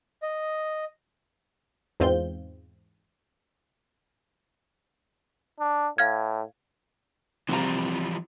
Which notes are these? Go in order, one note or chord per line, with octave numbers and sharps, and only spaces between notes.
D#5
E2 G#2 C4 F4 G6
D4
A2 F5 F6 G#6
C2 C3 E3 F3 G3 F4 A#5